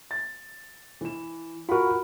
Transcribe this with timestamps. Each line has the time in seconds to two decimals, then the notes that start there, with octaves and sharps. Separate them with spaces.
0.11 A6
1.01 E3 E7
1.69 F4 F#4 A#4 F#5 B5